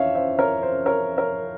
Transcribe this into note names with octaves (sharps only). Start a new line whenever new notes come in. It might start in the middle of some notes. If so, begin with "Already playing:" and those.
Already playing: F2 E3 C#5 E5 F5
C5 E5
A#4 C#5
C5
A#4 C#5
A#4 C#5